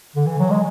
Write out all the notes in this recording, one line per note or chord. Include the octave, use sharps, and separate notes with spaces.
D3
E3
F#3
G#3